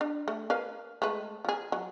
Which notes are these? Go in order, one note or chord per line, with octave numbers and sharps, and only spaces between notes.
D4
A3
A#4 B4 F5
G#3 A3 B4
F3 G#4
F#3